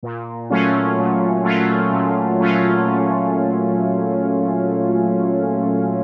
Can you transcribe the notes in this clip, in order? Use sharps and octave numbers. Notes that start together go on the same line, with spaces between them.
A#2
F#3 A3 C#4 F4
A#2
F#3 A3 C#4 F4
A#2
F#3 A3 C#4 F4
A#2